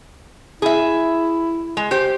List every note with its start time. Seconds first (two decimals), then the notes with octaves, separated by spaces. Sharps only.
0.62 E4 G#4 E5
1.77 G#3
1.91 G4 C5